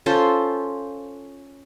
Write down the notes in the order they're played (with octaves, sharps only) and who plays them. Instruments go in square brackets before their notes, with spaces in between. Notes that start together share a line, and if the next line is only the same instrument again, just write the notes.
[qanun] C#4 F4 A4 C5